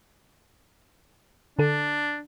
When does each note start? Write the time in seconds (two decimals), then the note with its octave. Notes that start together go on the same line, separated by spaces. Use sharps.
1.59 D3 D4 A4